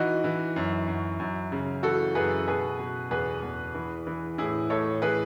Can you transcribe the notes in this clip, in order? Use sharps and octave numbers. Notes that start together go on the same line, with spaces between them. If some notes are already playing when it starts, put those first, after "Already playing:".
Already playing: E3 D#4 F#4
E3
F#2
F#2
F#2
C#3
E3 F#4 A4
F#2 G#4 B4
B2 G#4 B4
B2
E2 G#4 B4
E2
E3
E3
A2 E4 G#4
A2 A4 C#5
E3 G#4 B4